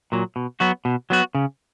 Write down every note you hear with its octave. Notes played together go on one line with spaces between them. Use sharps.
A#2 F#3
B2
F#3 B3 F#4
B2
F#3 B3 F#4
C#3